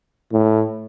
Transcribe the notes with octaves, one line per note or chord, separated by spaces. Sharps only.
A2